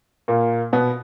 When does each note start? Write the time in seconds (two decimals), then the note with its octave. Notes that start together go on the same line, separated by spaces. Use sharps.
0.28 A#2 A#3
0.73 B2 B3